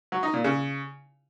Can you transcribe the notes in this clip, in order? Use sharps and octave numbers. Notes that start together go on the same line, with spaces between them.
F#3
D#4
A#2
C#3